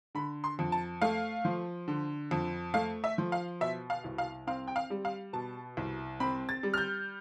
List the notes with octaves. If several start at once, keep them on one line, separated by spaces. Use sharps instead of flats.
D3 B5
C6
F2
A5
A3 F5
F3
D3
F2
A3 F5
E5
F3
F5
B2 E5
F5
C2
F5
C4 F5
G5
F5
G3
F5
B2 A5
C2
C4 B5
A6
G3
F6
G6